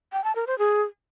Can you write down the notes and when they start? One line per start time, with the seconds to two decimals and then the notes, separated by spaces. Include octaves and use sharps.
0.13 G5
0.24 A5
0.36 A#4
0.47 C5
0.59 G#4